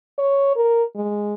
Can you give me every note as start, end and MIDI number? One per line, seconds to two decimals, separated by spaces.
0.18 0.53 73
0.56 0.83 70
0.96 1.34 56